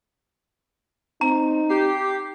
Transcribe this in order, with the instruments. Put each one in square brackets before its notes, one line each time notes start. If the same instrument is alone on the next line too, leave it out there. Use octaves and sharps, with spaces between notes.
[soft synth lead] C4 [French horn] D#4 [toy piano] A#5
[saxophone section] G4 [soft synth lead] C7